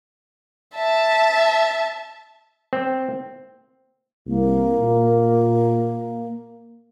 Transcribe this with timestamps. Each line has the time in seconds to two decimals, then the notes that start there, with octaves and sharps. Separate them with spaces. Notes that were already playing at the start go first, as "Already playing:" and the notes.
0.75 E5 A5
2.73 C4
4.28 C2 A#3
4.79 A#2